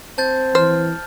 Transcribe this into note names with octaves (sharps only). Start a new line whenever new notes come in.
C4 A5 G6 A6
E3 C5 F6